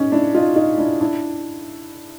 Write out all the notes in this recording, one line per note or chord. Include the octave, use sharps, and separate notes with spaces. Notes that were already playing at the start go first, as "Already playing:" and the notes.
Already playing: C#4 D#4
D4 E4
D#4 F4
D#4 F4
D4 E4
D4 E4